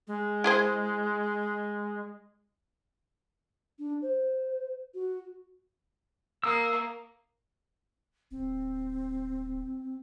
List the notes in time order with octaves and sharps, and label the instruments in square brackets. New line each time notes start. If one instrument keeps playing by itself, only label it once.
[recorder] G#3
[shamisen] E4 G#4 C5
[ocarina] D4
C5
F#4
[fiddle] A#3 [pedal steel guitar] D#6 E6
[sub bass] D1 [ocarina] C4